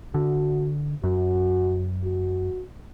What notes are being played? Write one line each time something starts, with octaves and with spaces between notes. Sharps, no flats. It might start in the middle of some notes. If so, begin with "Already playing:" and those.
D3 F#4
F#2 F#4
F#4